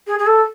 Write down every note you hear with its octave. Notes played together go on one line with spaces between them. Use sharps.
G#4
G#4
A4